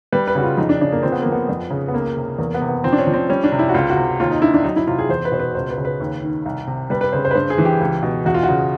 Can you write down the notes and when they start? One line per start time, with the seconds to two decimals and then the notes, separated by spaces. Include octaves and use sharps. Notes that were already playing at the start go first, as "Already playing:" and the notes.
0.12 G3 B4
0.28 B4
0.35 C#3 F#4
0.43 F4
0.58 F2 D#4
0.69 D4
0.81 C#3 D4
0.92 A#3
1.03 F3 C4
1.12 B3
1.22 F3 A#3
1.32 B3
1.49 F2
1.70 C#3
1.88 B3
1.93 C#2 A#3
2.17 C3
2.38 E2 A#3
2.54 B3
2.61 C3
2.69 B3
2.84 F3 C4
2.92 D4
2.98 C#4
3.07 F3
3.13 C4
3.29 G3 C#4
3.44 D4
3.52 C3
3.59 E4
3.69 F#4
3.74 C#2 F4
3.90 F#4
3.97 C3
4.20 D#2 F4
4.31 D#4
4.42 D3 E4
4.54 D4
4.64 F#3 D#4
4.76 E4
4.87 C3 F4
4.99 G#4
5.09 E2 C5
5.25 B4
5.32 B2 C5
5.40 B4
5.55 C#2 C5
5.70 B4
5.78 C#3
5.85 B4
6.00 D#2
6.23 D#3
6.45 C2
6.67 C3
6.90 G3 B4
7.01 B4
7.12 C#3 C5
7.25 C5
7.31 B4
7.35 G2 C5
7.50 G#4
7.58 E3
7.65 G4
7.81 C#2
8.03 B2
8.25 E2 F#4
8.34 F4
8.43 F#4
8.49 C#3